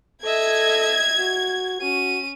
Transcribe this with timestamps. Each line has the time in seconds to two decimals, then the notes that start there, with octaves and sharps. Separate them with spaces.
0.25 A4 D#5 E5 G#6
1.19 F#4
1.81 C#4 F#4 D#7